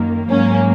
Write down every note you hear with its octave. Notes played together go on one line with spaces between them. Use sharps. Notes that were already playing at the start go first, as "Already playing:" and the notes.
Already playing: F#2 D#3 A#3
G#2 F#3 A#3 C#4